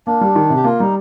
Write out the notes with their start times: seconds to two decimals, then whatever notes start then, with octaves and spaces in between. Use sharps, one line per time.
0.07 A#3 D4
0.21 G3
0.35 D#3
0.50 C3
0.57 G4
0.64 A#3 F4
0.80 G3 D#4